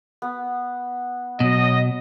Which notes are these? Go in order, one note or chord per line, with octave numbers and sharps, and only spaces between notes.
B3
B2 F#3 D#5